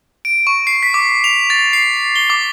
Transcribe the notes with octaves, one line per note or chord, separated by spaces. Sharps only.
D7
C#6
C7
B6
D6
F7
A6
C7
G7
D6